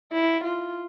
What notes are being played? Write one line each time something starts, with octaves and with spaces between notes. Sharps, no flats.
E4
F4